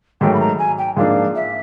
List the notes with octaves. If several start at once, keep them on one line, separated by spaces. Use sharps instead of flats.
G#2 D#3 F#3 A3 G5
B5
A#5
G#5
G5
G#2 F3 A#3 D4 F5
E5